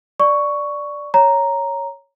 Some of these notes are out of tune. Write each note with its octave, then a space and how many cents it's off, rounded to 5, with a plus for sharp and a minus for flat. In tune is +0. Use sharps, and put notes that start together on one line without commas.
D5 +0 C#6 +5
C#5 +0 A#5 +0